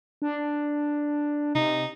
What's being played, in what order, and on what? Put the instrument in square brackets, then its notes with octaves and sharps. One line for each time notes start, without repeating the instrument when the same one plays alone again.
[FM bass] D4
[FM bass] C3 [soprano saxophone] D#4